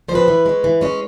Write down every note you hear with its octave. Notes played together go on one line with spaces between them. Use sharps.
F3 G#3 C4 B4 C5
E3
G#3 C#4
E3
G#3 C#4